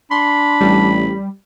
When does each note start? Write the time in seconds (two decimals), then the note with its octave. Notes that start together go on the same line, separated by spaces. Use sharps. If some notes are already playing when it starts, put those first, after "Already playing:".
0.11 D4 B5 C6
0.61 A1 G3